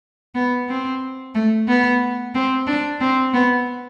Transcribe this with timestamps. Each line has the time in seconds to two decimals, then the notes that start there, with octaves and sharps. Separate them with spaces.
0.35 B3
0.68 C4
1.35 A3
1.68 B3
2.35 C4
2.67 D4
3.00 C4
3.33 B3